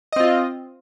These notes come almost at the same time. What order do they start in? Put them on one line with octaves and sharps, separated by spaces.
D#5 C4 F4